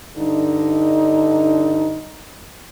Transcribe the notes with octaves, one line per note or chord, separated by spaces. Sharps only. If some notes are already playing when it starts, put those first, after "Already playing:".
G2 D3 D#4